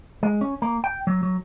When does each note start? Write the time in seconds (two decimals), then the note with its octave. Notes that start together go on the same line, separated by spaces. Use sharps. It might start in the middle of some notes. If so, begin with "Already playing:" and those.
0.23 G#3
0.41 C#4
0.62 A#3
0.84 G5
1.07 F#3
1.23 F#3